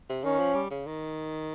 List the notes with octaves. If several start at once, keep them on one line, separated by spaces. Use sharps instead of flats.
C3
D#3 C#4
F3
G3
C#3
D#3